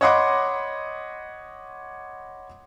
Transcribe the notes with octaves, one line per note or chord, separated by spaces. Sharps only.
C#5 D#5 F#5 B5 C6 D6